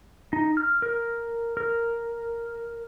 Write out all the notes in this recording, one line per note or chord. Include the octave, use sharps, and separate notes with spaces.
D#4
F6
A#4
A#4